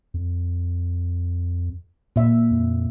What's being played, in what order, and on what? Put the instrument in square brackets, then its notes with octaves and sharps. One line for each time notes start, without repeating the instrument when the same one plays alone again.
[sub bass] F2
[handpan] A#2 E5
[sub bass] F2